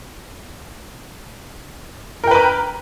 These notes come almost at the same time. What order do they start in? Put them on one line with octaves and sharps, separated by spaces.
A#4 G5 B4 A#5